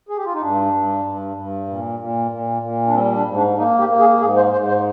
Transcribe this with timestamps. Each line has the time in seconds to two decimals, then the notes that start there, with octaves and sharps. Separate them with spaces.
0.09 G#4
0.17 G4
0.25 F4
0.33 D#4
0.41 G2 D4
0.73 G2
1.05 G2
1.37 G2
1.68 A#2
2.00 A#2
2.31 A#2
2.62 A#2
2.87 D4
2.94 G3 C4
3.15 D4
3.26 G#2
3.36 D4
3.57 A#3 D#4
3.79 G4
3.89 A#3
3.99 G#4
4.21 G#2 G#4
4.36 C5
4.52 G#2 C5
4.68 C5